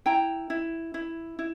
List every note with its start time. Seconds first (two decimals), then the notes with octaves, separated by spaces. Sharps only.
0.06 E4 G5 A#5
0.50 E4
0.94 E4
1.39 E4